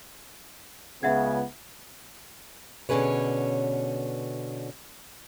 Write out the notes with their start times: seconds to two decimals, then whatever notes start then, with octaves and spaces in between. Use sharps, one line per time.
1.03 C#2 C#3 B3 E5 F#5 G#6
2.89 B2 D3 C#4 G#4 B4 C#5